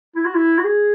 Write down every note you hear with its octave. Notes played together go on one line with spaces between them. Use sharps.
E4
F#4
E4
F#4
G#4